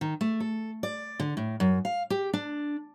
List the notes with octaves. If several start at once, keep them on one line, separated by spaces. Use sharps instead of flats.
D#3
A3
A4
D5
D3
A2
F#2
F5
G4
D4